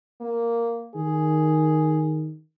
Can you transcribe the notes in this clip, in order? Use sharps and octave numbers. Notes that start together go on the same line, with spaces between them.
A#3
D#3 G#4